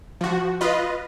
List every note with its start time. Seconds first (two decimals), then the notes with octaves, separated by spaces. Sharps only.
0.21 F3 F#4
0.61 F4 B4 D#5